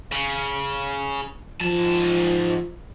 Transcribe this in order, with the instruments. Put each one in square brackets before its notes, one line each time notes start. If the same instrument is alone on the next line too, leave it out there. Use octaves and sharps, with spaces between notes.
[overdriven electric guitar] C#3
[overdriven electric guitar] G#2 A5 [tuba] F3